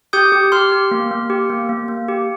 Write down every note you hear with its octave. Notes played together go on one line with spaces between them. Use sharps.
G4 D#6 G6
G4
G4 C6 F6
G4
A#3
A#3
G4
A#3
A#3
A#3
G4